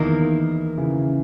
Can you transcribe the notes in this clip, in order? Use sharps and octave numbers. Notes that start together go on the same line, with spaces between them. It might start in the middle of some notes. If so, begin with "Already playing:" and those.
Already playing: E2 D#3 A#3 E4
C#3 E3